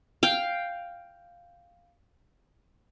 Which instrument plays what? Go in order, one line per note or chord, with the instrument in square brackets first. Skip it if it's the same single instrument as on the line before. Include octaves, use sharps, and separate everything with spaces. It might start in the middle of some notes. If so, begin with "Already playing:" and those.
[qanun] F5 G5